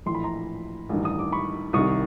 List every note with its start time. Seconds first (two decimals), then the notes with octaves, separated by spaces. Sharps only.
0.06 A#1 A2 E3 C6
0.15 B5
0.24 A#5 C6
0.89 A1 G2 D#3
1.05 D#6
1.19 D6
1.32 B5 C#6
1.73 C2 C3 D#3 C#6 D#6